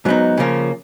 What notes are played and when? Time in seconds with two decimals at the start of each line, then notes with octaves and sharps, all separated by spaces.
0.05 G#2 F#3 B3 D#4
0.37 C#3 F3 A#3 C#4